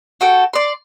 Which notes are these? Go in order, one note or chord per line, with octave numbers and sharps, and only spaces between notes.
F#4 A4 G5
D5 C6